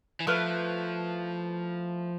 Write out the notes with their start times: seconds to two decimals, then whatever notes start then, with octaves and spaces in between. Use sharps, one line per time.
0.20 E3
0.27 F3 A3 E4 B4 F5